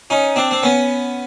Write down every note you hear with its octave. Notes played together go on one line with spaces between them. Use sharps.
C#4 D#4
C4 D4
C4
B3 C#4